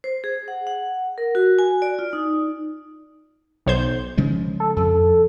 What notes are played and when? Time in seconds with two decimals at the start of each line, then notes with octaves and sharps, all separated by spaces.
0.04 C5
0.24 G#4
0.48 F#5
0.67 F#5
1.18 A#4
1.35 F#4
1.59 G#5
1.82 D5
1.99 F4
2.13 D#4
3.66 B1 C5 G6
4.17 C#3 F3 G#3
4.60 A4
4.77 F2 A4